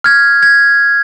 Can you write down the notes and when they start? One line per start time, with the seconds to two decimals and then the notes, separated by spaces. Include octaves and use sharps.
0.04 F6 G#6
0.43 G#6